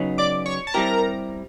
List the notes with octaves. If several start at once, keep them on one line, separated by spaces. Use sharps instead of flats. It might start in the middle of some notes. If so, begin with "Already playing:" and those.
Already playing: C#3 F#3 B3 D#4
D5 D6
C#5 C#6
A5
G3 C4 E4 G4 A#4 A#5